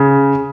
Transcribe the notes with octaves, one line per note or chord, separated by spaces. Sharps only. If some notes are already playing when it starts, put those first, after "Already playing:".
Already playing: C#3